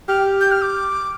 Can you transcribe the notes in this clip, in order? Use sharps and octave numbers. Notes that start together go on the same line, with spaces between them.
G4 F6
G6
F6
D6